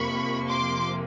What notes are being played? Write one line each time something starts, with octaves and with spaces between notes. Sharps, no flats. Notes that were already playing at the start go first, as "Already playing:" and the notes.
Already playing: F2 C3 F3 A#3 B5 C#6
C6 D6